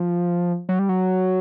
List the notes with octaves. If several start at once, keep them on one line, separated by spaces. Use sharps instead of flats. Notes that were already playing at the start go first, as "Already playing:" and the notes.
Already playing: F3
F#3
G3
F#3